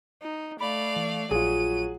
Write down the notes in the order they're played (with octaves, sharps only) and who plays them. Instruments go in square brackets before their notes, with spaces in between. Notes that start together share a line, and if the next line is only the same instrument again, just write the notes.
[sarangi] D#4
[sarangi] A3 [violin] D5 F5 [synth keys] B5
[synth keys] E3
[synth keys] A#1 F4 [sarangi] F#3 [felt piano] G#4 [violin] D#7